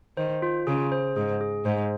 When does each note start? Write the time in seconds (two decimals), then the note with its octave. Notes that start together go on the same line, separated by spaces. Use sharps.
0.17 D#3 C5
0.42 F4
0.67 C#3 G#4
0.92 C5
1.16 G#2 G#4
1.41 G#4
1.65 G#2 C5